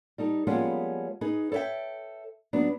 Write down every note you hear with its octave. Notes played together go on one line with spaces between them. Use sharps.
G3 D#4 A4
F3 G3 G#3 A#3 B3 C#4
D#4 G#4 B4
A4 C#5 D5 E5 G5
F#3 B3 D4